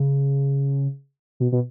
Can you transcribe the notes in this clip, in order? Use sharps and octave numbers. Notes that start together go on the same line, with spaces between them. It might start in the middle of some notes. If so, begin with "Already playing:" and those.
Already playing: C#3
B2
B2